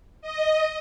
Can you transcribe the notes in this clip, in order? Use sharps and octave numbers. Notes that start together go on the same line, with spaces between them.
D#5